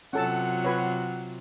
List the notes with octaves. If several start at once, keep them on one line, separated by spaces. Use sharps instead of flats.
C3 F#3 C#4 F4 A4 F#5 A5
F#4 B4 C#5